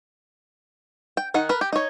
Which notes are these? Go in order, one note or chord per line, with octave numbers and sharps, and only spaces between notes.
G5
D#3 D#4 F#5
A#4 B4
G4
D#4 C#5